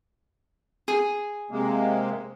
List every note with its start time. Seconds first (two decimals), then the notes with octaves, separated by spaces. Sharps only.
0.88 G#4
1.51 C3 G#3 A#3